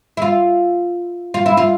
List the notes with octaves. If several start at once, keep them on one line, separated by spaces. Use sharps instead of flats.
E4
F4
F4
E4
F4